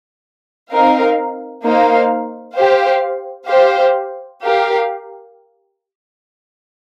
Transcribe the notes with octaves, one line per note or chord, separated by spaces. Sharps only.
C4 D#4 A#4 F5
A#3 D#4 C5 F5
G4 C5 F5
G4 C5 F5
G4 A#4 F5